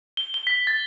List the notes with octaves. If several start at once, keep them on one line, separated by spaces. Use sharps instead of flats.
G7
G7
B6
A6